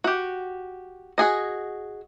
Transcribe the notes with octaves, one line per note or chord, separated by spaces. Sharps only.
F#4 G4
F#4 G#4 D#5